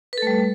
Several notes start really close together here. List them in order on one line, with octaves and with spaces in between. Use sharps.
B4 A4 A3 G3